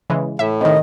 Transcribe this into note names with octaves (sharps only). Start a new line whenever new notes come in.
C#3 E3 G#3
A2 E5
C3 D#3 D#5